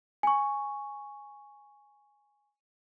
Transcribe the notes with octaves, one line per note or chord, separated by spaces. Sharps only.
G#5 C#6